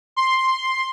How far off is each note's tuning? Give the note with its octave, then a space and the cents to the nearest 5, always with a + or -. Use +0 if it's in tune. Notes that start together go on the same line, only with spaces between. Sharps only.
C6 +5